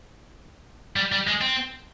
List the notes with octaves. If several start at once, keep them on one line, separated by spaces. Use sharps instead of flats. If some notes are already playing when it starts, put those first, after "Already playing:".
G3
G3
G#3
C4